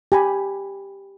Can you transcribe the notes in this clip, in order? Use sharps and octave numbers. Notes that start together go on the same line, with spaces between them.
G4 G#5 B5